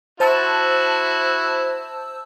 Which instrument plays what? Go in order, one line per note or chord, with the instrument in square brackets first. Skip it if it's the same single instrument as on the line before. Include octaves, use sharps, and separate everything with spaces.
[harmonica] E4 F#4 [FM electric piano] C5 A5 E6